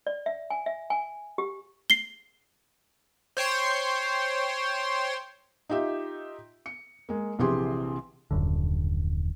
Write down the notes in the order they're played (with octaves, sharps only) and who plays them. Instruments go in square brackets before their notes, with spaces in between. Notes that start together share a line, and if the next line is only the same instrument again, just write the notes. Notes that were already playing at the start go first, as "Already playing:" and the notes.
[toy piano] D5
E5
G#5
E5
G#5
G4
[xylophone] C7 G7
[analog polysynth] C5 C#5 G5 C6
[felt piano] D#4 F4 G4 E5
C#7
G#3 A#3
A#1 C3 E3 G4 G#4 C6
[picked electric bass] D#1 F#2 D3